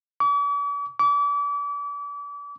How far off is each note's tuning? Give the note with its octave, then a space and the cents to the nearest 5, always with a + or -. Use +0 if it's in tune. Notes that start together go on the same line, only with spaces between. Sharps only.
D6 -45
D6 -35